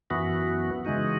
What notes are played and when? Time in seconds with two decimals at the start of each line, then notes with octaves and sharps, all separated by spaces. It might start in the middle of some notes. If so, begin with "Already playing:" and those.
0.10 F#2 E3 B3 F#4
0.85 C#3 E3 G#3 D#4 F#4